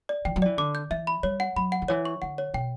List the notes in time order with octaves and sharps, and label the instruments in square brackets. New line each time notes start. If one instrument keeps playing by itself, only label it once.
[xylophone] D5
[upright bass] E3 [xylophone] G5
[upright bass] F#3
[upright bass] E3 [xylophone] D5
[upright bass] D3 [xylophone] D6
[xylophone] G6
[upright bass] E3 [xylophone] E5
[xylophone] B5
[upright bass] G3 [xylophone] C#5
[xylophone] F#5
[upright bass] F#3 [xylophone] B5
[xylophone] F#5
[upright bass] D3
[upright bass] E3 [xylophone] C#5
[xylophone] C#6
[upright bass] D3 [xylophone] F#5
[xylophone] C#5
[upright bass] B2 [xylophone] G5